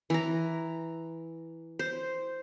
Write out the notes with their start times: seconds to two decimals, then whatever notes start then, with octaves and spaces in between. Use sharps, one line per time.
0.10 E3 A#5
1.79 C5